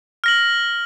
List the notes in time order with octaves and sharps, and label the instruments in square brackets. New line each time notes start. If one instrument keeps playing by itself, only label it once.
[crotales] F6 A#6 F#7